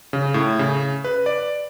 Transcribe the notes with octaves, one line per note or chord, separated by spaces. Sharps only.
C#3
A2
C#3
B4
D5